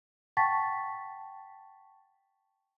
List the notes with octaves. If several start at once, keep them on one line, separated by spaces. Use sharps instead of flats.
F#5 G5 A5 C#6 A6 B6